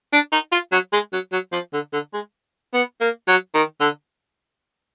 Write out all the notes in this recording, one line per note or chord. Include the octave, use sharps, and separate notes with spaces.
D4
D#4
F4
F#3
G#3
F#3
F#3
F3
D3
D3
G#3
B3
A#3
F#3
D#3
D3